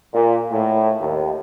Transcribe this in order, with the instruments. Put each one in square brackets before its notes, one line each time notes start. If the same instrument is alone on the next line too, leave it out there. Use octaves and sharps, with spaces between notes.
[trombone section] A#2
A2
D#2